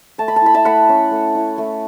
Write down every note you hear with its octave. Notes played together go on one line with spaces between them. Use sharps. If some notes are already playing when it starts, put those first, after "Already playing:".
A3 A5
B5
A5
E4 B5
E5 A5
A3 F#5 B5
C#4
A3
E4
A3